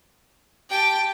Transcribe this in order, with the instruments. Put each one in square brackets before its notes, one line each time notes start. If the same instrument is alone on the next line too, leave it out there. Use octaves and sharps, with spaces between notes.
[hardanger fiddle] G4 A5 [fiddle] G5